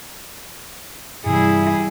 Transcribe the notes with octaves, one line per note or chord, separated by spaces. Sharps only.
G2 C3 E3 G3 E4 G#4